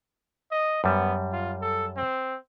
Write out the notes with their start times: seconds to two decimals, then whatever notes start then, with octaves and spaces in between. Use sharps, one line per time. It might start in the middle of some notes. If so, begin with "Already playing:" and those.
0.51 D#5
0.84 F#2 G3 B3
1.32 F4
1.61 A4
1.97 C4